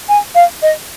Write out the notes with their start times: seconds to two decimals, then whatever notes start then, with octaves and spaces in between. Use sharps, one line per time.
0.09 G#5
0.35 F5
0.62 D#5